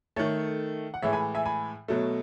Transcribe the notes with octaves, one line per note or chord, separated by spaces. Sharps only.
D#3 A3 A4 C#5
F#5
A2 E3 G#3 C#5 E5
G#5 B5
E5 G#5
G#5 B5
B2 F#3 A3